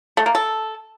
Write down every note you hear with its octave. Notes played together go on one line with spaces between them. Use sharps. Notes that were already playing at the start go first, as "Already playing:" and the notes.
A3
A#3
A4